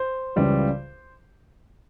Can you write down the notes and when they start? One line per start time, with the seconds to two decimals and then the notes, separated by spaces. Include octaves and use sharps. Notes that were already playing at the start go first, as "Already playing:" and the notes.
Already playing: C5
0.36 C#2 C#3 E3 G3